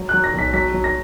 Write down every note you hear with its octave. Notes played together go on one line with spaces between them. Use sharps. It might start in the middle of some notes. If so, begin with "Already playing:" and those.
Already playing: F#3
F#6
F#3
A#6
B1 B6
F#3 B6
F#3
A#6